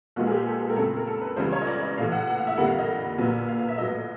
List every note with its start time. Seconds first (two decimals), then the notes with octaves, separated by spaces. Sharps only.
0.16 A#1 A#2 F3 G#3 B3 F#4
0.27 G#4
0.32 G4
0.47 A4
0.61 G#4
0.70 A#4
0.76 F2 C#3 F#3 A3 C4 A4
0.97 A#4
1.07 A4
1.21 B4
1.37 C#2 C#3 E3 G3 B3 C5
1.52 C#5
1.62 D#5
1.67 D5
1.82 D#5
1.98 A#1 A2 E3 F5
2.12 F#5
2.27 F#5
2.38 F5
2.47 E5
2.57 F2 D3 G3 A#3 F#5
2.68 F5
2.79 D#5
3.18 A#1 A#2 F#3 B3
3.49 F5
3.59 F5
3.69 E5
3.78 A#1 A2 F#3 B3 D#5